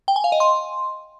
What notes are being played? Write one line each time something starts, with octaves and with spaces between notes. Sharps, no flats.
G5
G#5
F5
D#5
C6